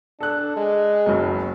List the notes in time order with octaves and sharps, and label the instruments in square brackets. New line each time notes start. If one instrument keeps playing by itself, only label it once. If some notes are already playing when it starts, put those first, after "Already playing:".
[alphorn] D4 [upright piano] A4 F#6
[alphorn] G#3
[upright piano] F#1 B1 F#2